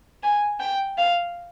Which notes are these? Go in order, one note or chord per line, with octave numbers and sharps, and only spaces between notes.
G#5
G5
F5